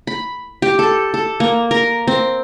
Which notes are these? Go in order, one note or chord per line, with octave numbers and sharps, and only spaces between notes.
B5
G4
A4
A4
A#3
A#4
C4